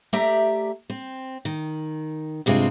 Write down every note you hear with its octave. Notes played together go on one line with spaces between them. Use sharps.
A3 G4 D5 E5 A#5
C4
D#3
G2 C3 G#3 C4 F4